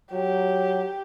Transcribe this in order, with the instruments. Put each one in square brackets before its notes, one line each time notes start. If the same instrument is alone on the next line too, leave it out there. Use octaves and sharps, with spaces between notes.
[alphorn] F#3 [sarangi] G4